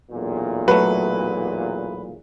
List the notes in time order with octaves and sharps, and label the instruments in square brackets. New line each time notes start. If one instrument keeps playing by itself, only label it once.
[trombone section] B1 E2 A#2
[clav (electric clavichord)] F#3 A3 [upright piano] B4